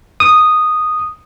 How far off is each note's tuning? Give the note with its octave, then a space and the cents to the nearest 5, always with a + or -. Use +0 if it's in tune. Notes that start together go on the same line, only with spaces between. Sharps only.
D#6 -5